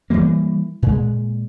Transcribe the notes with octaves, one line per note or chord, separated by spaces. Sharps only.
E3 F#3 G3 A#3
A#2 G#3